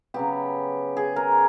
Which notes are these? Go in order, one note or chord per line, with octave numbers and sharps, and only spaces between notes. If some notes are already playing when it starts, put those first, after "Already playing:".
C#3 F#3 B3 G4
G#4
A#4